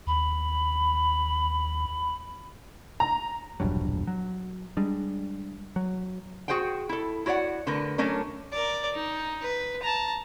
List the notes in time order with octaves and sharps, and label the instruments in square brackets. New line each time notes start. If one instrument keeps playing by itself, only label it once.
[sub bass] D#2 [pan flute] B5
[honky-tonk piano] A#5
[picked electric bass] E1 A#1 G2 F#3
F#3
G3 G#3 D4
F#3
[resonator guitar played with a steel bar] F#4 G#4 C5 F#5 G5
E4 A4
E4 F#4 C#5 D5 F#5
D3 A3 A#4 B4
F#3 A3 C#4 D4 A#4
[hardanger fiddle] A#4 D5
D#4
B4
A5 A#5